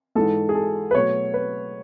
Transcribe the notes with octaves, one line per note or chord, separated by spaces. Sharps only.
G#2 E3 G#3 A4
G#4
A4
B4
B2 F#3 A3 C#5
B4